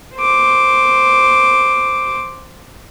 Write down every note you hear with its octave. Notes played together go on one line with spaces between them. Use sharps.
C5 D6